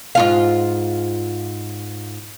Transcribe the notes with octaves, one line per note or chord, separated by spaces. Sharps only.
G#2 F4 F5